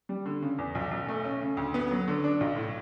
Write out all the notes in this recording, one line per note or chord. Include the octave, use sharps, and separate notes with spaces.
G3
D3
C#3
E2
B1
B1
A3
C#4
C#3
D2
B3
F#3
D3
D4
B1
A2